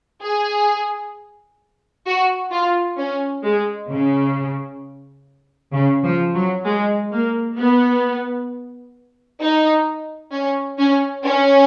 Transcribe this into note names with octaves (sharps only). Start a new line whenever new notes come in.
G#4
F#4
F4
C#4
G#3
C#3
C#3
F3
F#3
G#3
A#3
B3
D#4
C#4
C#4
C#4